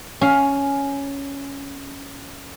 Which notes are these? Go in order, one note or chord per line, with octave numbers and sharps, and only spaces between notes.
C#4 F5